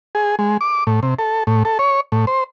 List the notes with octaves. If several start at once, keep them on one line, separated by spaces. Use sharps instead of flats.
G#4
G#3
D6
A2
C3
A4
A2
A4
C#5
A2
C5